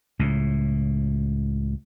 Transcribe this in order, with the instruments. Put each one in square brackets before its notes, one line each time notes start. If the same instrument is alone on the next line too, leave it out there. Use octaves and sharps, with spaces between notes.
[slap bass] C#2 A2